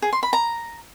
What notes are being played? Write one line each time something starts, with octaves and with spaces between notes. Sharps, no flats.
G#4
C6
B5
A#5